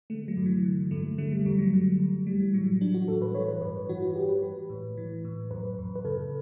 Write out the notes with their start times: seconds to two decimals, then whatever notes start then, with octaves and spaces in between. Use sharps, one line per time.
0.10 D3 A3
0.28 F#3
0.37 G2
0.46 E3
0.65 D3
0.91 G2 A3
1.18 D3 A3
1.32 G3
1.46 F#2 G3
1.59 F#3
1.73 D3
1.99 F#2
2.27 E3 G3
2.40 E3
2.54 A2 F#3
2.81 E3 D4
2.94 F#4
3.08 A2 A4
3.22 B4
3.34 E3 C#5
3.48 B4
3.61 G2 B4
3.89 E3 F#4
4.02 F#4
4.16 G2 G4
4.29 B4
4.42 E3
4.70 A2
4.97 E3
5.25 A2
5.51 F#2 B4
5.78 F#2
5.95 B4
6.05 C#3 A4